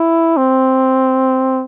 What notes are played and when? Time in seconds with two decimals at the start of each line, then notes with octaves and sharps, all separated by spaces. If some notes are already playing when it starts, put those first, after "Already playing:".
Already playing: E4
0.37 C4